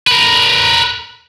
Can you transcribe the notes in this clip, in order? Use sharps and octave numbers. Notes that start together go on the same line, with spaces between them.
A#4 B4